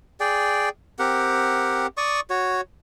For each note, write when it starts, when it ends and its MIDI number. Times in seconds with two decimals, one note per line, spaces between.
0.20 0.69 68
0.20 0.69 74
0.20 0.69 79
0.99 1.87 60
0.99 1.87 67
0.99 1.87 70
0.99 1.87 78
1.97 2.20 74
1.97 2.20 85
1.97 2.20 87
2.30 2.61 66
2.30 2.61 73